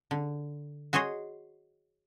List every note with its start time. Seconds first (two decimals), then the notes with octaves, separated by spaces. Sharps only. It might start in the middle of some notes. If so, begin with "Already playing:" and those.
0.11 D3
0.93 F#4 G#4 C5 C#5 D#5